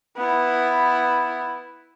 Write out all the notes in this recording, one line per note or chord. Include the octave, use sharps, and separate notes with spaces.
B3 E4